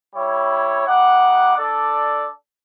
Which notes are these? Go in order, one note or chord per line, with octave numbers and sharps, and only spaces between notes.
G3 E4 C#5
G3 D#4 F#5 D6
D4 A4 D5